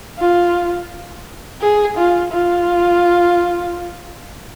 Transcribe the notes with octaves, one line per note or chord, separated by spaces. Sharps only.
F4
G#4
F4
F4